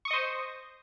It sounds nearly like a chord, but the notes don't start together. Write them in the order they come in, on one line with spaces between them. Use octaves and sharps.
C#6 D#6 D#5 C5